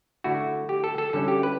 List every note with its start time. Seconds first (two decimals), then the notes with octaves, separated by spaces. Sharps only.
0.24 D3 A3 E4 F#4
0.69 G4
0.84 A4
0.98 A4
1.13 D3 G3 C#4 E4 A4
1.28 G4
1.43 B4